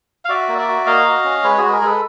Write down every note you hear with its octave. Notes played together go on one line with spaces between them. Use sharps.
F5
F#4 D5 E5
A#3
D5 E5
F#4
A#3 D#5 F5
F#4
C#4
G#3 B4 C#5
G#3 F#4 G#4
B4
G#4 A#4
G#3 A4 B4